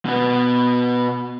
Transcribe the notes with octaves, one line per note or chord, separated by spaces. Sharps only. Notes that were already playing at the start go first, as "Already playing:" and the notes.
B2 B3